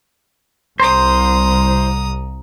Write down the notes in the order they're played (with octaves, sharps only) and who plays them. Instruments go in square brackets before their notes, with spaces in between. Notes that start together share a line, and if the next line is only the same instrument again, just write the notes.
[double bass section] C2 [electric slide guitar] C5 [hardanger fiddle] A#5 D#6